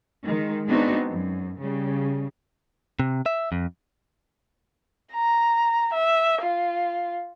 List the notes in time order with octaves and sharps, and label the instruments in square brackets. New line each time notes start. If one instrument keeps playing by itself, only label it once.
[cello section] D#3 G#3
G#3 B3 C4 D4 D#4 F#4
F#2
C#3 G3
[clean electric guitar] C3
E5
F2
[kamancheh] A#5
E5
F4